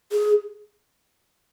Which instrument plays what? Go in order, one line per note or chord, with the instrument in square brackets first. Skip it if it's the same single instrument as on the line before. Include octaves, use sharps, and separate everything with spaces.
[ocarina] G#4